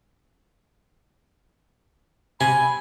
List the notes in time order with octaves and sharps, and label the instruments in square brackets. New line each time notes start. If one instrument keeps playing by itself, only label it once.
[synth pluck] C3 [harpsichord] G#5 [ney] B5